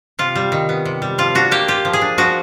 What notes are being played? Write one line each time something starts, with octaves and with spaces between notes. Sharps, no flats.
C3 F4
G3
D#3
B3
C3
G3
F3 F4
D4 F#4
A#3 G4
F4 G4
F3
G#4
D4
F3 F#4